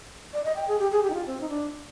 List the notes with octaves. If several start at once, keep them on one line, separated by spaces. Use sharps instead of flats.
D5
D#5
G5
G#4
G4
G#4
G4
D#4
F4
C4
D#4
D4